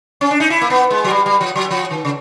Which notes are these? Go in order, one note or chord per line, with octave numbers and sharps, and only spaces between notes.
C#4
D4
D#4
E4
A#3
B3
G#3
F#3
G3
G3
F3
F#3
F3
D#3
C#3